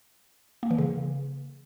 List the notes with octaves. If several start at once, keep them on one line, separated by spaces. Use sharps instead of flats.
A#3
E3
C#3